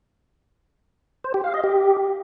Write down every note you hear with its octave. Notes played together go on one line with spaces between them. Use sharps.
C5
G4
F5
D#5
G4